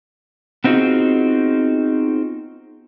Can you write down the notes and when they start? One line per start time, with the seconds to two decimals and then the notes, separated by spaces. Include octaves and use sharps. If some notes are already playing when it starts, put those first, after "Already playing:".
0.64 B3 C4 D#4 F4 F#4 G#4